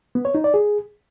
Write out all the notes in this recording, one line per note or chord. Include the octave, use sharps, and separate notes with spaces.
B3
C#5
D#4
D5
G#4